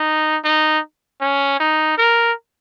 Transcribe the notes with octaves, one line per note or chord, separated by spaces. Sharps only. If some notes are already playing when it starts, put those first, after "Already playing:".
Already playing: D#4
D#4
C#4
D#4
A#4